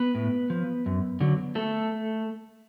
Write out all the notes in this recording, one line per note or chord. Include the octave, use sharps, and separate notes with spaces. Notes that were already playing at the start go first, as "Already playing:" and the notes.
Already playing: B3 B4
A2
F3
F#2
D3 F#3
A3 A4